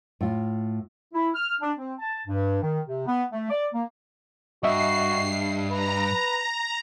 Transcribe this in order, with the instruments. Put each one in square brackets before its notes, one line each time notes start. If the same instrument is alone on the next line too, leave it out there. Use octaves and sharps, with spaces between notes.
[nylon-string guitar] A2 F4
[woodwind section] E4
F6
D4
C4
A5
G2
D#3
C3
B3
A3
D5
A#3
[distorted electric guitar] G2 [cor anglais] F#4 [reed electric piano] D#5 E5 [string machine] C7
[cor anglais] B4 [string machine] A#5